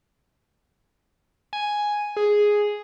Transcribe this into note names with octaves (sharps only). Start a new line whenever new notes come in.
G#5
G#4